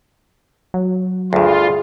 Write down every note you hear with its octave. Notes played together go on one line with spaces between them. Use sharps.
F#3
D2 G2 F4 G#4